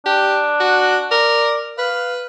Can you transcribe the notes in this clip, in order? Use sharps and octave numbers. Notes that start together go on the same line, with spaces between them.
D4 G4
F#4
A#4 D5
B4 F5